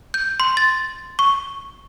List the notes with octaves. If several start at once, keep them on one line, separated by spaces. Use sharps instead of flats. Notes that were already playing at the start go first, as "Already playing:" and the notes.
G6
C6
A6
C#6